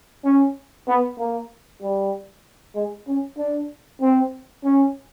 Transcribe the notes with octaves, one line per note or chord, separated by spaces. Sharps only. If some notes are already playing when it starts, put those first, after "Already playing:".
C#4
B3
A#3
G3
G#3
C#4
D4
C4
C#4